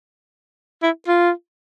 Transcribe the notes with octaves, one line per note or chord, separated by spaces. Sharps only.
E4
F4